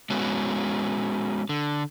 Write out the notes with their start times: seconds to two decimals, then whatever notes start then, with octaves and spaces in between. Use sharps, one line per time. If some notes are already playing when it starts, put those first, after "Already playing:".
0.10 G#3 B3 C#4 F#4
1.49 D3